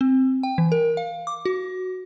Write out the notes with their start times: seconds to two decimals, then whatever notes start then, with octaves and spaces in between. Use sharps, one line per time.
0.01 C4
0.43 G5
0.58 E3
0.72 A#4
0.97 F5
1.27 D6
1.45 F#4